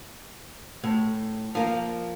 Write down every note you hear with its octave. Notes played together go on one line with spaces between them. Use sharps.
A2
F3 A#3